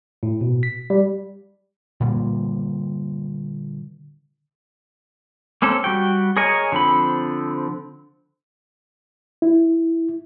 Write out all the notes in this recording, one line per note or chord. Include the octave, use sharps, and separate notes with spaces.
A2
B2
B6
G3
A#2 D3 G3 A#3
A#3 C4 C#4 A4
G3 F#4 G5
G#4 A#4 C#5 D#5 G#5
D3 F3 C4 B5
E4